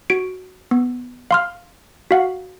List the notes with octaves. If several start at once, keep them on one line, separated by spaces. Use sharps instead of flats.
F#4 D7
B3
F5 C6 F6
F#4 F5 F#5